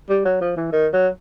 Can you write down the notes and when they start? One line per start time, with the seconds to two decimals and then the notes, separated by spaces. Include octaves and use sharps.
0.09 G3
0.25 F#3
0.41 F3
0.56 E3
0.72 D#3
0.93 F#3